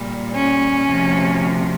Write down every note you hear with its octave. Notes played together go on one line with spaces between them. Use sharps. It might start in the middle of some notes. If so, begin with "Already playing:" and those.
Already playing: A#2 G3
C#4
D2 C3 F3